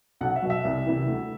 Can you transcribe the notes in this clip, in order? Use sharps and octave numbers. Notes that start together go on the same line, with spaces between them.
B1 F#5
E5
B2 F#3
E5
C2
C3 E3
D2